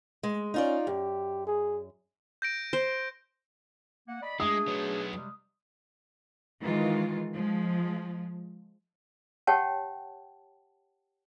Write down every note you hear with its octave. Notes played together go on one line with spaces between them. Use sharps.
G#3
C#4 D#4 F4 D5
F#2 G4
G#4
G6 A#6 D7
C5
A#3 F#5
D5 D#5 B5
G#3 A3 D4 G#4 D#6
F#3 B3
C3 G3 G#3
D#3 E3 G#3 F4
F3 G#3
G4 C#5 F#5 G5 A5